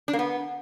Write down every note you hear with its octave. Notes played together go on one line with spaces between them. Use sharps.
D4
A#3
B3